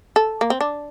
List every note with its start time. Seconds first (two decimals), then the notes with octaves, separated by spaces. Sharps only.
0.16 A4
0.41 A#3
0.50 C4
0.61 D4